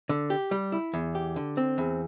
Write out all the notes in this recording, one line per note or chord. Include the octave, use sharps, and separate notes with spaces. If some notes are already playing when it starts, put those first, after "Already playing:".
D3
G4
G3
E4
E2
G4
D3
C4
E2